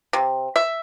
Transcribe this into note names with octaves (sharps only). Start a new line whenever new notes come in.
C3
E5